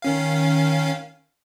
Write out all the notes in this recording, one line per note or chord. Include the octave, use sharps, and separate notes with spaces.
D#3 C#4 F5